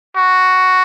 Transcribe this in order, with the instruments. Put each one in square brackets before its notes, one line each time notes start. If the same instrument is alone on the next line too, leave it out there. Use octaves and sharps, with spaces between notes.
[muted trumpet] F#4